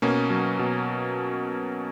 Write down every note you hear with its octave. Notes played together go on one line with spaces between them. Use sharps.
B2 A#3 C#4
F#3
B2